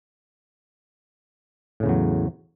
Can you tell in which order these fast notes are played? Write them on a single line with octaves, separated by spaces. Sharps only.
A2 C#3 E2 F#3